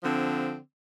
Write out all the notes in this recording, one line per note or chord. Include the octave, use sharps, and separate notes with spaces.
D3 F3 C4